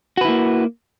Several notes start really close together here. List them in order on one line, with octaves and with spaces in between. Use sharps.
F#4 B4 E4 A#3